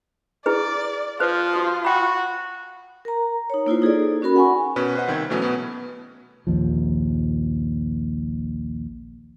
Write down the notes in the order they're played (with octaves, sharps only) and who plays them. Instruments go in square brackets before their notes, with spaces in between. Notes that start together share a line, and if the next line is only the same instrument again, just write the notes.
[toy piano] E4 G#4 B4 [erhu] D5
[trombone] F3 [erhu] F4 [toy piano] B4 C5
[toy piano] F#4 D#6
[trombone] F#4 [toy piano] G5 B5
[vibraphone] A#4 A#5
D#4 C#5
A#3 E4 F4 C5
D#4 G#4 A4 D5
C#4 F#4 A#4 B5
F#5 G#5 C#6
[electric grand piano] B2 C#4 B4
B4 C5 D#5 F#5
C2 D#3 C4 G#6
B2 E3 F#3 A3 B3 C#4
B2 B3
[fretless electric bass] A#1 D#2 F3